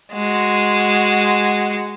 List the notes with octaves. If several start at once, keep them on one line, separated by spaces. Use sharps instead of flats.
G#3 F#4